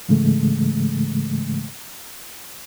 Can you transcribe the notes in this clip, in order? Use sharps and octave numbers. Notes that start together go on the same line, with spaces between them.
G#2 C#3 E3 G#3 A3